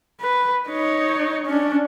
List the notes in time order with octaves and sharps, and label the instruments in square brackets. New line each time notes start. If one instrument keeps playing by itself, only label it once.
[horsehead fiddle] B4
D#4 C#5
C#4 D4